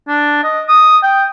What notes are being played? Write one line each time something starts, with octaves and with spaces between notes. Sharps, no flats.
D4
D#5
D#6
G5